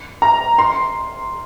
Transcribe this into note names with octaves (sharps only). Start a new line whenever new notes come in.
A#5
C6